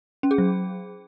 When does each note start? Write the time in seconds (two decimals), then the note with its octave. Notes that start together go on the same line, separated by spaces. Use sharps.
0.23 C#4
0.31 G#4
0.38 F#3